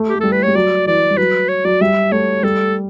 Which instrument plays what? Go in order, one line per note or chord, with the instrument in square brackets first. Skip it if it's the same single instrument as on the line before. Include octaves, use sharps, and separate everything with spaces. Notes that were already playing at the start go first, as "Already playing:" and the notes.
Already playing: [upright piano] A3
[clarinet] G4
[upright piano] A3
[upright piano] G3 [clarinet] A4
[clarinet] B4
[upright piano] G3 [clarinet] C#5
[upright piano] F#3 [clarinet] D5
[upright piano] E3 [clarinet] D5
[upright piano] G3
[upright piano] F#3 [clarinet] B4
[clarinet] C#5
[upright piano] F#3 [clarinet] D5
[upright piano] G3 [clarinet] E5
[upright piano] A3 [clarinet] C#5
[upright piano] G3 [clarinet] A4